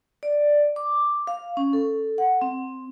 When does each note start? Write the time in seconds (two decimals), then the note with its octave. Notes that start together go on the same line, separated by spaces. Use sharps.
0.23 D5
0.76 D6
1.27 F5
1.57 C#4
1.73 A4
2.18 F#5
2.42 C4